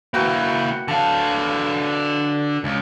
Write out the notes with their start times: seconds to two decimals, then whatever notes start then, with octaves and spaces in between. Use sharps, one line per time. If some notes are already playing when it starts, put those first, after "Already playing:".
0.14 A#3 E4 F#4 B4 G5
0.88 D3 F5 A5
2.64 C#2